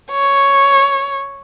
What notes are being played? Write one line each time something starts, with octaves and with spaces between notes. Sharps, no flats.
C#5